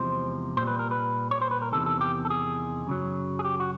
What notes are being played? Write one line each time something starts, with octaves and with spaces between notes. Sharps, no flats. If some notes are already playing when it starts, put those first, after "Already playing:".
Already playing: E2 C3 F3 G#3 C5
A#2 G3 C5
B4
A#4
B4
C#5
C5
B4
A#4
E2 C3 D#3 A4
A4
G4
A4
G#4
F#2 C#3 F#3
G#4
G4
F#4